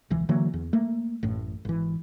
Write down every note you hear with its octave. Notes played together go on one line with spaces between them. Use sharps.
E1 C#2 E3
D3 E3 F#3 A#3
E2
A3 A#3
A1 F#2 A2
G#1 E3